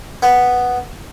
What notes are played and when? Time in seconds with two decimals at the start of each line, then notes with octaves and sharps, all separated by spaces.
0.23 B3